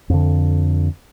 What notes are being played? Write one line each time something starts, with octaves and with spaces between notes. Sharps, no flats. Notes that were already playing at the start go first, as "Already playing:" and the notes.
F2 D3